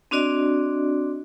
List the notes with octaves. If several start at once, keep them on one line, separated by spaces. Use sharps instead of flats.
C4 D4 F#4 D5 D#5